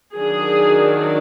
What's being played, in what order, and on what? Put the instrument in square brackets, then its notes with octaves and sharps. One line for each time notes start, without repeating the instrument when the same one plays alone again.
[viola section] D#3 F#3 D4 G#4